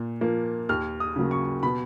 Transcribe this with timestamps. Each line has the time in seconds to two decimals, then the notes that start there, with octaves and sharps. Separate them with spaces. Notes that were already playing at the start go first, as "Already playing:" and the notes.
Already playing: A#2
0.21 F3 A#3
0.69 D#2 F6
1.00 D#6
1.16 C#3 F#3 A#3
1.31 C#6
1.63 B2 B5